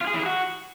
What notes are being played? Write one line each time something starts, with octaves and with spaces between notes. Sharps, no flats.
F4
G#4
E3
G#4
F#4